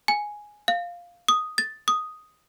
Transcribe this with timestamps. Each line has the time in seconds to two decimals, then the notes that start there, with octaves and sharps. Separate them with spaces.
0.08 G#5
0.68 F5
1.28 D#6
1.58 A6
1.88 D#6